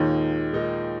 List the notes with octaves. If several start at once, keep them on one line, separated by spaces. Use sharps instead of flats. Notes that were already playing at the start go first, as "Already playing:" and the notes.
Already playing: D#2 A#2 D#3 G#3 D#4 A#4
A#2 G#3 D#4 A#4